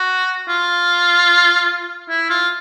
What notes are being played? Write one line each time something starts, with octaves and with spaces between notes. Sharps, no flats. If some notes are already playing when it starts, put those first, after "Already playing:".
Already playing: F#4
F4
E4
F4